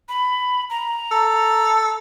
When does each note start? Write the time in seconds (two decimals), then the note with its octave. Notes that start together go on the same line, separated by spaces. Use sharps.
0.09 B5
0.70 A#5
1.11 A4